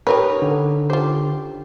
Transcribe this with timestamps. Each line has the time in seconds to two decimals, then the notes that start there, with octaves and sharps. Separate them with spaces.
0.07 C#4 D#4 G4 A#4 B4
0.42 D3
0.90 F4 G4 C5